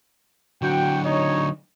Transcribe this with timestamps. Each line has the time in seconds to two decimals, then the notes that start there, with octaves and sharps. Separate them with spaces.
0.62 D3 F#3 F#4 G5
1.05 D#4 C#5